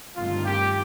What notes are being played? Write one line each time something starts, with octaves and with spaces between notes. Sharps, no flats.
G1 G2 D#3 A3 C4 F4
G4